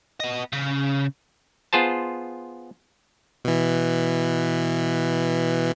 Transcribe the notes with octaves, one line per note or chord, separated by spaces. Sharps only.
B3 D#5
C#3
B3 F4 G#4 C5 A5
B2 E3